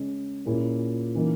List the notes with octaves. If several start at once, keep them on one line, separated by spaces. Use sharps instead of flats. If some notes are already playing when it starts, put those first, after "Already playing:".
Already playing: C#3 G#3 C#4
A#2 A#3 C#4 E4 G#4
C#3 E3 A#3 D#4